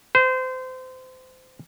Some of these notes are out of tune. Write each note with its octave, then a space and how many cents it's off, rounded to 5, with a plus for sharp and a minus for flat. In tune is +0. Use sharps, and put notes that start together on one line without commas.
C5 -25